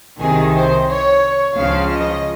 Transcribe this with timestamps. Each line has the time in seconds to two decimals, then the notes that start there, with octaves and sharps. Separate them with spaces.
0.17 C2 C3 D#3 G#4
0.53 C5
0.87 C#5
1.55 C#2 C#3 F3 F5
1.91 D#5